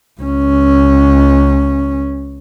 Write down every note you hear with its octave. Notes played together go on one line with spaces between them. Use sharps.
C#2 C#4